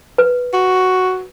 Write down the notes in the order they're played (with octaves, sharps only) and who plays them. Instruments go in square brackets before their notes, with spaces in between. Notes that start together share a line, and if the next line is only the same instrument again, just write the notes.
[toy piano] B4
[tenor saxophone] F#4